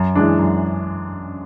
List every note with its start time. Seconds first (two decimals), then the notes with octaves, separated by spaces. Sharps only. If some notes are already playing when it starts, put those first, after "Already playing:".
Already playing: F#2
0.15 E3 G#3 D4
0.39 F#2